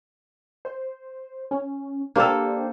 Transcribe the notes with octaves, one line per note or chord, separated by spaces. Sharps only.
C5
C#4
A#3 D4 G4 A4 C5